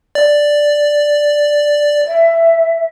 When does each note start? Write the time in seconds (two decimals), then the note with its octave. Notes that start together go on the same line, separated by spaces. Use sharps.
0.15 D5
2.07 E5